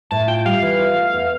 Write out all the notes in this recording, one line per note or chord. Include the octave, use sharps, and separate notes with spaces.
A2 A5
F4 G5
G3 F5
E3
F4
A3
E2